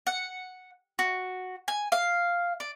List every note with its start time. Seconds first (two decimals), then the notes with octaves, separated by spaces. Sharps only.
0.07 F#5
0.99 F#4
1.68 G#5
1.92 F5
2.60 D5